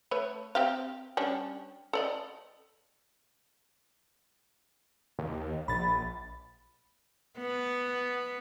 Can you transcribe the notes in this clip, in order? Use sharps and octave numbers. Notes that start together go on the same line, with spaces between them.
A3 B4 C#5
C4 G4 F5
G3 C#4 D4
A4 D5 D#5
D#2
A#1 B5 A6
B3